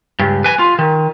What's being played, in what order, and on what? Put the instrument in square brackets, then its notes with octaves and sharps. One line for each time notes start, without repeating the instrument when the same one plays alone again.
[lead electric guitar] C#2 G2
B4 G#5
F4
D#3